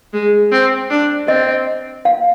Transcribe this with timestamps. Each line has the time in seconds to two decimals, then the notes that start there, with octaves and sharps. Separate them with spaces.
0.13 G#3
0.52 C4
0.90 D4
1.28 C4 D#5
2.05 F5